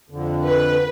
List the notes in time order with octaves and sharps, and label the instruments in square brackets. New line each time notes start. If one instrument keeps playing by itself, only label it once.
[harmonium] F2 D3
[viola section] B4